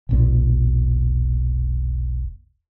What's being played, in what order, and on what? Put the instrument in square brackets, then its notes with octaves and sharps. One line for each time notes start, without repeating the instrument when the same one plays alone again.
[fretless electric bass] E1 B1 A#2